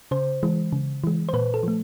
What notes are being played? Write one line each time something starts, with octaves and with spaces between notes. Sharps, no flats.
C#3 C5
E3 G#3
C#3
E3 G#3
C5
A#2 B4
A4
F3 A3